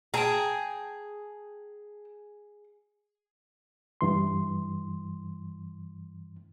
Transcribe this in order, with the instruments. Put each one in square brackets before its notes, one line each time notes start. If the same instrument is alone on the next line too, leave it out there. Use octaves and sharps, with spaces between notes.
[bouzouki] G#4 [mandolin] G5 A5 A#5
[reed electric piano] G2 E3 C6